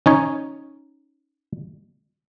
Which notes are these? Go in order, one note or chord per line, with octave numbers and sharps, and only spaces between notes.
C#4 D#4 C#5